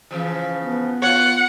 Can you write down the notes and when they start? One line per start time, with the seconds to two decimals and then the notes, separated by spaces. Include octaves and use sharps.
0.11 C#3 E3 F3
0.62 B3
1.02 F4 C#5 F#5